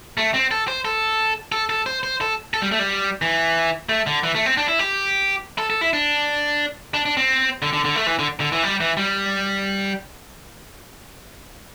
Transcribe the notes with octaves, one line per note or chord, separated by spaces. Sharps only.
A3
C4
A4
C5
A4
A4
A4
C5
C5
A4
A4
G3
A3
G3
E3
A3
D3
E3
A3
C4
D4
E4
G4
A4
A4
E4
D4
D4
D4
C4
D3
D3
D3
A3
E3
D3
D3
E3
G3
E3
G3